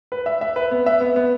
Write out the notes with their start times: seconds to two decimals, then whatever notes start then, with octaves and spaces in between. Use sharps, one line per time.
0.12 B4
0.26 E5
0.41 E5
0.56 B4
0.71 B3
0.86 E5
1.01 B3
1.16 B3